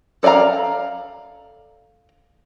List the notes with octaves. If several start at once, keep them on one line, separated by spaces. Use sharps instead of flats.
A4 D5 D#5 F5 A#5